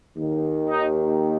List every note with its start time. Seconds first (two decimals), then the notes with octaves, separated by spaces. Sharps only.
0.16 D#2 D#3
0.70 D#4